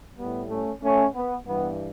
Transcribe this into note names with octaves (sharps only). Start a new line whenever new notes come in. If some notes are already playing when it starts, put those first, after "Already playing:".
A2 G3 B3
A3 C#4
A3 C#4
B3
G2 E3 G3 B3